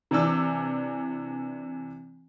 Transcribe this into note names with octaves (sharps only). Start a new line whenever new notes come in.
C3 E3 D4 D6 E6